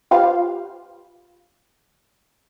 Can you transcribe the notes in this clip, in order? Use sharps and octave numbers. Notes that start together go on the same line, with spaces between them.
F4 G4 B4 C5 F5